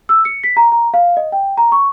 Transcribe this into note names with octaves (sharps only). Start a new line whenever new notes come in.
E6
C#7
B6
A#5
A#5
F5
D#5
G5
A#5
C#6